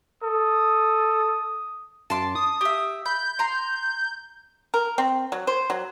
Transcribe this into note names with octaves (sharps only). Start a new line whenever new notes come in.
A4 D#6
F#2 A5 C6 D6
D#6
G4 E5
B5 G6
A#5 C6
A#4
C4
F#3
C5
F#3